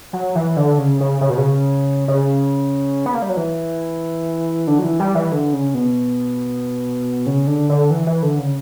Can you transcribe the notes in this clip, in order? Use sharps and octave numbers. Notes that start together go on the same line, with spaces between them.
F#3
E3
D3
C#3
C#3
C#3
B2
C#3
C#3
B3
A#3
G3
F#3
E3
D3
F#3
E3
G3
E3
D3
C#3
B2
C#3
D3
D3
E3
E3
D3
C#3